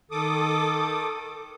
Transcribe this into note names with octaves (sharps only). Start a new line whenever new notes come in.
D#3 A4 D6 D#6